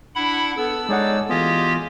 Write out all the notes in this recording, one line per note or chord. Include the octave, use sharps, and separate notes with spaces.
D4 E4 F#5 B5
B3 A4 E6
G#3 D#4 G#4 C#5 D5 F#5
E3 B3 F4 G4 G#4 D#5